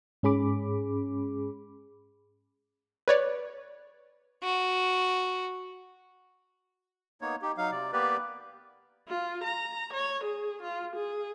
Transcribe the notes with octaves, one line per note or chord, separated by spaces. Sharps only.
G#2 C#4 G#4 B5 D6
B4 C#5 D5
F#4
A#3 B3 D#4 C#5
D#4 G4
F#3 D#4 F5
C3 D5
A#3 B3 G4 B4 D5
F4
A#5
C#5
G#4
F4
G#4